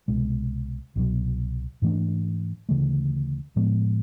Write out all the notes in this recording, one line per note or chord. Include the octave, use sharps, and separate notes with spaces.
C2 B2 G#3
C2 B2 F#3
G#2 E3 A3 D4
D2 C#3 E3 A3
A2 F3 G#3 B3